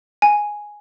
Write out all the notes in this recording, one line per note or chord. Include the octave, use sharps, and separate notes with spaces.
G#5